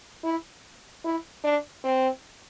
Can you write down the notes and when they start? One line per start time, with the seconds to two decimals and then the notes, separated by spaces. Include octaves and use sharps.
0.24 E4
1.04 E4
1.44 D4
1.84 C4